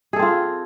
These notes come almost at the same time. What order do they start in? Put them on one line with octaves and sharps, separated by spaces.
G#4 A4 C4 F4